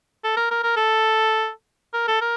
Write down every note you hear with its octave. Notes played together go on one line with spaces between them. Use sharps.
A4
A#4
A#4
A#4
A4
A#4
A4
A#4